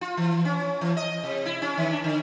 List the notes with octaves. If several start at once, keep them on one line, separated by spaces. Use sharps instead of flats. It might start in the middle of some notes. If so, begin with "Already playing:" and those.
F4
E3
C#4
E3
D#5
C3
E4
C#4
D#3
D4
D3